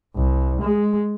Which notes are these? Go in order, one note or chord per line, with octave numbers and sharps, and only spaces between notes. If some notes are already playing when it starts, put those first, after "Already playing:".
C2
G#3